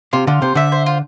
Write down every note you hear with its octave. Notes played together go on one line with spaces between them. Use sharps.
C3 F4
D3 F4
C3 C5
D3 E5
C5
F4